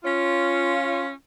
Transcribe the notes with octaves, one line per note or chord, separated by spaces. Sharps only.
C#4 F4